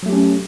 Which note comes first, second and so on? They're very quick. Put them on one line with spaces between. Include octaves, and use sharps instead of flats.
F#3 A3 G4 C#4